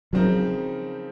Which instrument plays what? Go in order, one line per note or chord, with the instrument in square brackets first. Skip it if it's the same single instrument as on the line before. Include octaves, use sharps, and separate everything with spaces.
[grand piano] C#3 F3 C4 D#4 A#4 [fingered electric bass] F#3